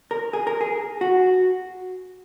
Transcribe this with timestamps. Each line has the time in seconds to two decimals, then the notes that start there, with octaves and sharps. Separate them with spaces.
0.11 A#4
0.33 G#4
0.47 A#4
0.61 G#4
1.01 F#4